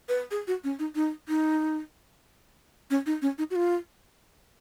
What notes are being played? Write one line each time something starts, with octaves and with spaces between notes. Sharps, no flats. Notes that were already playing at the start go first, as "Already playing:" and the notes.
B4
G#4
F#4
C#4
D#4
D#4
D#4
C#4
D#4
C#4
D#4
F#4
F4